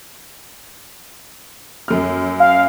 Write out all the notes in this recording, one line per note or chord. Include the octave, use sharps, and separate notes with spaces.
F#2 F6
F5